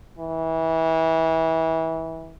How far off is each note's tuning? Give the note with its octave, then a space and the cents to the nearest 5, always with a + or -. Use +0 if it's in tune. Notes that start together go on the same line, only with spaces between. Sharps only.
E3 -25